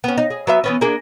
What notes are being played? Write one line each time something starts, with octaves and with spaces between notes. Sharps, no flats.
B3 C#4
D#4
G#4
F#3 B3 E5
E3 B3 C#4
A#3 D4 G#4